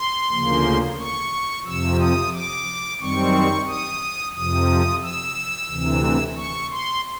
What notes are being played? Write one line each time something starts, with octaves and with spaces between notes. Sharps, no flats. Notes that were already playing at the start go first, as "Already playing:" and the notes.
Already playing: C6
D2 C#3 F3 A#3
C#6
F2 C3 F3 E6
D#6
D6
F#2 D#3 G3 C4 C#6
D#6
F2 C3 F3 D#6
E6
D2 C3 E3
C#6
C6